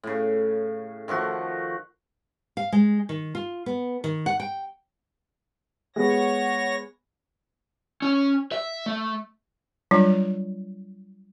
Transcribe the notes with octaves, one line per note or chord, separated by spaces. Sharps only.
A2 C#3
D#3 F3 A3 F#4
F5
G#3
D#3
F4
B3
D#3
F#5
G5
G#3 B3 G#4 C#5 F#5 A#6
C#4
E5
A3
F#3 G3 D4 F4